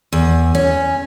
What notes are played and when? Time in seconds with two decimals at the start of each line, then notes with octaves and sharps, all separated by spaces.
0.12 E2
0.55 C#4